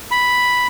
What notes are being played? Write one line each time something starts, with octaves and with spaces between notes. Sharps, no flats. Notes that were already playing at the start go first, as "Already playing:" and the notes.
B5